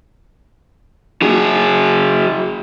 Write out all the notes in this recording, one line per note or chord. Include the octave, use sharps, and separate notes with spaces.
F#3 G#4